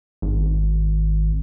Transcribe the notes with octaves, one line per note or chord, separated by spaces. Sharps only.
G#1